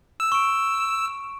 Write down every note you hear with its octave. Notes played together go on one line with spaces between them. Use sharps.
E6
C#6 E6 D7